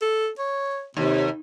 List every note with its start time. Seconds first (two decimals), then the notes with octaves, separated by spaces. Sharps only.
0.01 A4
0.38 C#5
0.97 D#2 C3